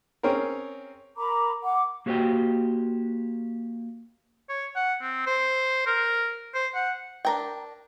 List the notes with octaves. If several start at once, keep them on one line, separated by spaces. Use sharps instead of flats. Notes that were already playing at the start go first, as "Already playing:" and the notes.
C4 C#4 G#4 A#4
A#4 A#5 B5 D6
F#5 D6
A#3 F#4 G4 A#4 C5 G5
C#5
F#5
C4
C5
A#4
C5
F#5
D4 A#4 G5